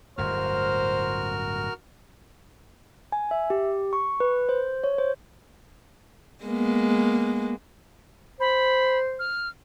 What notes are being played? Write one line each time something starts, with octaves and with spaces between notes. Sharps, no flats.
D1 G1 A2 F#4 A#4 C5 F6
G#5
E5
G4
C#6
B4
C5
C#5
C5
G#3 A#3 B3
C5 B5
F6